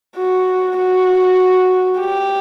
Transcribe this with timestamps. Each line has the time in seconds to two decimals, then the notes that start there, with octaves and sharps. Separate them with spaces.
0.16 F#4
0.77 F#4
1.99 G4